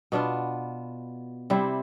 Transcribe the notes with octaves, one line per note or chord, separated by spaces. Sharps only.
B2 B3 D4 F4
C3 G3 C4 E4